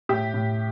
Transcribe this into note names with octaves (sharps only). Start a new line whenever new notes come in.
A2 G4
A2